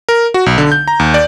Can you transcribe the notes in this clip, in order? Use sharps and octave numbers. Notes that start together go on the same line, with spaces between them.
A#4
F#4
B1
D3
G6
A#5
D#2
D5